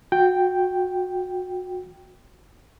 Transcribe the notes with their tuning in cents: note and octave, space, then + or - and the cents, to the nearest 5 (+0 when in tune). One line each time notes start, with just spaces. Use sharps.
F#4 -25 G5 +0